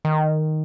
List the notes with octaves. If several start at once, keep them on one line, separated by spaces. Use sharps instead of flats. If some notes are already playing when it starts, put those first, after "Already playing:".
D#3